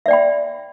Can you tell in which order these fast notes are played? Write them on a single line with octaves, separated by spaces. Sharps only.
E5 D5 G5 B5